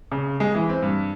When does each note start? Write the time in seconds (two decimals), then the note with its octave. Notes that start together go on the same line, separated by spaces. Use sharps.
0.12 C#3
0.40 G#3
0.55 E3
0.69 C4
0.82 G2